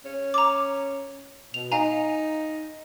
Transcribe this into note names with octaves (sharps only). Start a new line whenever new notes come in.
C#4
A#5 D6
B2 F7
D#4 F5 G#5 A#5